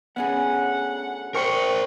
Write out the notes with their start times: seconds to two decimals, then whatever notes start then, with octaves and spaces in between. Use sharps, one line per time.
0.16 D2 B3 C#4 G#4 F#5
1.34 A#4 C5 G5 C#6 C#7